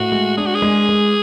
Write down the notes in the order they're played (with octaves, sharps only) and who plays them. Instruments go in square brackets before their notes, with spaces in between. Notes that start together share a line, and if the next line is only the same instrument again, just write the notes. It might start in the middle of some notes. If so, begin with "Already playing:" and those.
Already playing: [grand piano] A2 [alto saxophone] F#4
[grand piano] G#3
[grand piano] D4 [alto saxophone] G#4
[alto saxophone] F#4
G#4
[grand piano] G#3
G#3